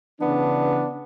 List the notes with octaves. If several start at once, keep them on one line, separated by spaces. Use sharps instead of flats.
C#3 E3 B3 D4